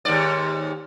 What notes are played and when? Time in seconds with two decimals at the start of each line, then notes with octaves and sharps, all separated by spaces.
0.05 D#2 G#2 D5